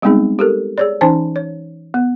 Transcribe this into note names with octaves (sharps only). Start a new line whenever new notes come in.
G3 G#3 B3 C4 D#4 G#4
G4 A4 A#4
G#4 C#5 D5
E3 C#4 D#4 C5 G#5 A5
C#5
B3